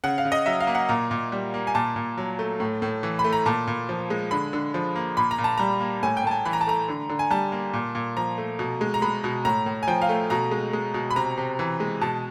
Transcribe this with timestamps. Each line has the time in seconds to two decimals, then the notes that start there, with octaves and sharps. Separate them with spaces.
0.04 C#3 F#5
0.18 F5
0.25 C#3
0.32 D#5
0.46 F#3 E5
0.60 F5
0.67 A#3
0.75 F#5
0.89 A#2 A#5
1.11 A#2
1.32 G3
1.54 A#3
1.67 G#5
1.75 A#2 A5
1.96 A#2
2.17 F#3
2.39 A3
2.60 A2
2.82 A2
3.03 E3
3.19 B5
3.24 A3
3.33 A#5
3.46 A#2 A5
3.67 A#2
3.89 F3
4.10 G#3
4.31 D3 B5
4.53 D3
4.74 F3
4.96 A#3
5.17 A#2 B5
5.31 A#5
5.38 A#2
5.44 A5
5.58 G3 A#5
5.80 A#3
6.03 A2 G#5
6.17 G5
6.24 A2 A5
6.31 G#5
6.45 E3 B5
6.53 A#5
6.61 A5
6.67 A3 A#5
6.88 D3
7.09 D3
7.19 G#5
7.31 G3 A5
7.52 A#3
7.73 A#2
7.95 A#2
8.16 F3 A#5
8.38 A3
8.59 B2
8.81 G#3
8.94 A#5
9.02 G#3 B5
9.24 B2
9.45 A2 A#5
9.66 A2
9.83 G#5
9.88 F3 G5
10.02 F5
10.09 A3
10.30 B2 A#5
10.51 G#3
10.73 G#3
10.94 B2
11.11 B5
11.16 C3 A#5
11.38 C3
11.59 E3
11.80 G#3
12.01 B2 A5